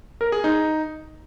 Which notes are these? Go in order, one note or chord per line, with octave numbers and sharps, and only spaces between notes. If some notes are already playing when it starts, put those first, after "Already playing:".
A#4
G#4
D#4